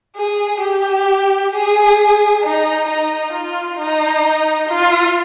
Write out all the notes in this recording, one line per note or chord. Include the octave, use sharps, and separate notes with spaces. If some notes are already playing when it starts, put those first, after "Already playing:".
G#4
G4
G#4
D#4
D#4
F4
D#4
F4